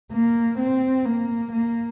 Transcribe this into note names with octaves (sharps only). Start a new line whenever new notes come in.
A#3
C4
A#3
A#3